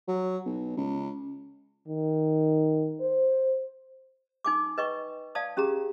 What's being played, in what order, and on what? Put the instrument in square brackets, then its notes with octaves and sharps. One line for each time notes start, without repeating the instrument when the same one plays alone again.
[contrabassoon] F#3
B1
C#2
[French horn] D#3
C5
[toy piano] D#4 G#5 D6
B4 D#5 G5 C#6
D5 F5 A5 D#6
C#4 G4 G#4 A#5